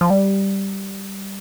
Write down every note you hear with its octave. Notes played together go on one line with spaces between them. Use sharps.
F3
G3